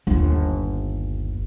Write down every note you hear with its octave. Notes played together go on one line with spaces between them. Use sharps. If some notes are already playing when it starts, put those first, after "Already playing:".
G1 D#2